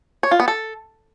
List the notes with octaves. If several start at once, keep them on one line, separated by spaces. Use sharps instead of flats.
C#5
F4
B3
A4